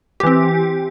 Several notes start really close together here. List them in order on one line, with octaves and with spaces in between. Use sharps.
G4 E3 C4